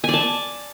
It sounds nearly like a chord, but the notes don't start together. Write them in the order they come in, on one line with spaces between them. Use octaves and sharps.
G#5 D5 A5